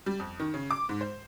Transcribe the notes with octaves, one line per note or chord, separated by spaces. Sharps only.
G3
F2
D#3
C#3
D6
G#2
C5